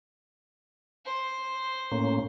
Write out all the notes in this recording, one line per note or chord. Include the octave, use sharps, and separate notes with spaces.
C5
A2 A#3 C#4